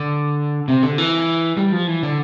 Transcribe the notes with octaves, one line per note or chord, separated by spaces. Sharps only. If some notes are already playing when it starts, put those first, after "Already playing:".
Already playing: D3
C3
D3
E3
G3
F3
E3
D3